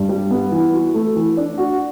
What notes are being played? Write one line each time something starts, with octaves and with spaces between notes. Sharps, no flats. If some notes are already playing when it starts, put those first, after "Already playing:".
Already playing: G2
G3
B3
E3
F#4
A3
E3
D4
F#4